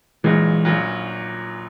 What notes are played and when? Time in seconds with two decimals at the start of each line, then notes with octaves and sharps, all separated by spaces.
0.24 A#1 A#2 E3 F#3 G#3
0.65 A#1 A#2 F#3